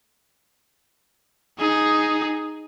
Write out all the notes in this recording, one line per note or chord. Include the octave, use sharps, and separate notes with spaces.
D#4 G#4